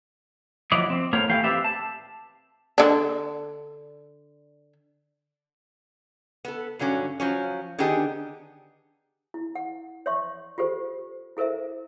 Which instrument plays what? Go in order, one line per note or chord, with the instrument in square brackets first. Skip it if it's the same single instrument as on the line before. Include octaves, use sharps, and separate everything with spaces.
[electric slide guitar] F3 F#3 E4 D5 D#5
C4
A2 A#3 A#4 C5 C#5 A#5
A2 E3 A3 G4 F5 G5
C4 G4 B4 D5 E5
A5
[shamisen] D3 D4
[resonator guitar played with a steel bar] B3 A4
G2 D3 F#3 C#4
F3 F#3 C#4
D3 D#3 B3 D4 G4 G#4
[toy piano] E4
F#5
C#5 D5 E5 C6 C#6
F4 G4 A4 C5
E4 A4 A#4 C5 E5